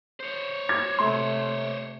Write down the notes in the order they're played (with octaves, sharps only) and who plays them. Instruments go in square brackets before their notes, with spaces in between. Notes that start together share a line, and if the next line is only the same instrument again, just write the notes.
[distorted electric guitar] C5 C#5
[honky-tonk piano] D6 G#6
[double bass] C3 A3 [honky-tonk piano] C6